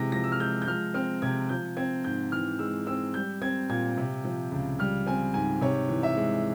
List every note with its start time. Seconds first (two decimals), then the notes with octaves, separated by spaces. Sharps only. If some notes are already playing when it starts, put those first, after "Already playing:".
Already playing: C3 E3 G#3 A#6
0.12 F3 A#6
0.24 E6
0.32 F6
0.40 G#3 G6
0.62 G6
0.67 F3 F6
0.94 C4 F6
1.22 C3 G#6
1.49 F3 G6
1.77 C4 G#6
2.04 G#2 G6
2.32 E3 F6
2.59 G#3 E6
2.87 C4 E6
3.14 G3 G6
3.42 C4 G#6
3.69 A#2 G#6
3.97 C3
4.24 F3
4.51 C#2
4.79 G3 F6
5.07 C4 G#5
5.34 G#2 G#5
5.61 C3 C#5
5.89 E3
6.03 E5
6.17 G#3